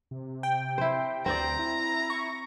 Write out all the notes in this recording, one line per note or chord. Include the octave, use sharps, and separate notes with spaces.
C3
G5
E4 C5
D2 C4 C5 D5 A#5
E4
C#6